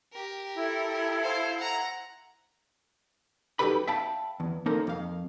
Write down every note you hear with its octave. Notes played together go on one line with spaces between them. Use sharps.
G4 A#4
E4 A4
C5 F5
F#5 A#5
F#2 D#4 G4 A4 B4 B5
E5 F5 G5 A5 B5
E2
A#3 D#4 A4 A#4 C5
F2 F5